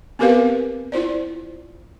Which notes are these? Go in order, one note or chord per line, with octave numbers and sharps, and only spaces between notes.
B3 C4 G4 A#4 B4 F5
E4 F4 C5 D5